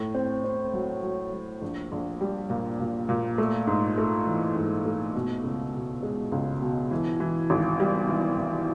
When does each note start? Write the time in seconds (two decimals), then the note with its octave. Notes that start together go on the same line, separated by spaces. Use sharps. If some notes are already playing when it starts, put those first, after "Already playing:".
Already playing: A2
0.15 C4
0.44 C4
0.73 F#3
1.03 F#3
1.33 F#3
1.62 A#1
1.92 A#1
2.21 G3
2.50 A#2
2.80 A#2
3.09 A#2
3.38 A3
3.67 G#2
3.98 A3
4.27 E3
4.56 G#2
4.85 A3
5.15 B2
5.44 C#2
5.73 B2
6.03 G#3
6.32 C#2
6.62 B2
6.91 E3
7.20 E3
7.50 G#1
7.80 G3
8.09 E3
8.38 E3